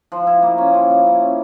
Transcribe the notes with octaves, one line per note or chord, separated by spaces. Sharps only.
F3
E4
A#3
C#4
F3
C#4
E4
C#4